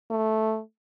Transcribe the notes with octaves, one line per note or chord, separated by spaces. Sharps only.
A3